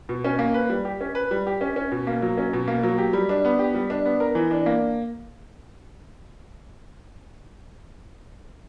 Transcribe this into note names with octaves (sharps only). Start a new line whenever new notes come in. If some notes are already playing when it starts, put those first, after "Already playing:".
B2
C#4
A#3
B4
G3
G4
C#4
B4
G3
G4
C#4
C#4
B2
A#3
F#3
C#4
B2
A#3
F#3
G4
G3
D4
B3
G4
G3
D4
B3
A#4
E3
D4
A#3